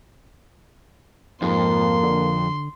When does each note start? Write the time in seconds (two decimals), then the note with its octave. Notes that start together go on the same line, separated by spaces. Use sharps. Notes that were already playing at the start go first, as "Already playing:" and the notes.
1.42 F2 G#2 A#3 C6
2.03 D3